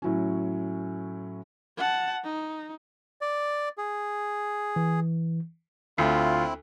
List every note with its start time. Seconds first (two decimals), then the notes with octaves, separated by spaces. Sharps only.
0.02 A2 F#3 C#4
1.77 F#5 A5
2.24 D#4
3.21 D5
3.78 G#4
4.76 E3
5.98 D2 C4 E4 F4